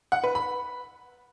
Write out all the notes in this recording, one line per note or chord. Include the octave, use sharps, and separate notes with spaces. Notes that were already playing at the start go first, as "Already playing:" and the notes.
F#5
B4
B5